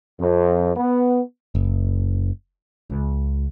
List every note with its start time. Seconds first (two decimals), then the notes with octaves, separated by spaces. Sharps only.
0.20 F2
0.77 B3
1.55 F#1
2.90 C#2